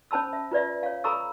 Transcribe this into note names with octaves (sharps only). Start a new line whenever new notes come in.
C#4 C5 A5 B5 E6
E5
F4 B4 D5 E5
C#5 F5
A4 A#5 B5 C#6 E6